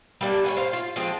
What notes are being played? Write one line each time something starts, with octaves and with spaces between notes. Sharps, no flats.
G3 A#3 D4
C#5 F#5 G#5
C5 F5
F4
F3 G#3 C4 F4